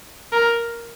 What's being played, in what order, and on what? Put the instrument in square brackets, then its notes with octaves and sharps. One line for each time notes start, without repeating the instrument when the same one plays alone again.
[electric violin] A#4